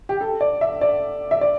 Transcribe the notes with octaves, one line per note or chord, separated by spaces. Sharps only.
G4
A4
D5
E5
D5
E5
D5